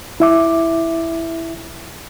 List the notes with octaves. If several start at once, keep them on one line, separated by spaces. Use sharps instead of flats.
E4 E5 D6